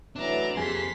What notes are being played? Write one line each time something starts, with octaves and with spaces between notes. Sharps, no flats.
E3 F#3 A3 D4 A4 A#5
F2 C3 A#3 G#4 A4 C5 C6 B6